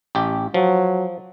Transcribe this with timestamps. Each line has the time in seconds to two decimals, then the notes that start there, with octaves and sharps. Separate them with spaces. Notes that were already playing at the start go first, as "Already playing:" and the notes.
0.15 A1 G4
0.54 F3 F#3